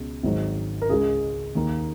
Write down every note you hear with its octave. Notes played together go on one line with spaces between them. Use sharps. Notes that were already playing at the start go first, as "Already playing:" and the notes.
Already playing: C#2 B2
G#1 G#2 D#3 F#3
A#4
C#2 C#3 G#3 G#4
D#2 D#3 A#3